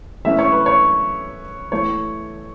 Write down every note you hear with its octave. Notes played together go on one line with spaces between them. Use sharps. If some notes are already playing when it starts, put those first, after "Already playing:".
E3 A3 C#4 E5
C#5
B4
C#5
E3 A3 C#5